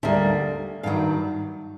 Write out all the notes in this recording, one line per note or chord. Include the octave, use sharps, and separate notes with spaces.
D2 D3 G3 A#3 E5
G2 D#3 F#3 F5